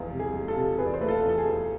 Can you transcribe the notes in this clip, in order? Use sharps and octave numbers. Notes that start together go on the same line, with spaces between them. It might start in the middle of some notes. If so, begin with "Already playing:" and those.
Already playing: E2 F3 G#3 F4 G#4
C3
G#4
G#3
F4 A4
C3
E2 G#4 B4
D5
C5
A3 B4
F4 A4
E2
A4
G#4
E2